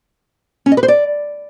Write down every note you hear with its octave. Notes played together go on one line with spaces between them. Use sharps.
C#4
D#5
B4
C5
D5